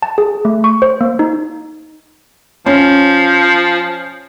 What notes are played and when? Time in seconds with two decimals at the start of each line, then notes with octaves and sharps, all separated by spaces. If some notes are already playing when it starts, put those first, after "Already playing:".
0.02 A5
0.18 G#4
0.45 A3
0.64 C#6
0.82 C5
1.01 A#3
1.19 D#4
2.66 F3 C#4